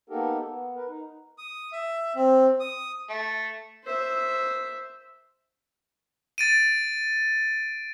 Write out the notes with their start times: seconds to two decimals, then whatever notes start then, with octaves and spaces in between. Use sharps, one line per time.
0.10 A#3 B3 D#4 G4 A4 A#4
0.47 B3
0.75 A#4 B4
0.87 D#4
1.38 D#6
1.72 E5
2.15 C4
2.60 D#6
3.09 A3
3.84 C5 E5
6.38 A6 D7 D#7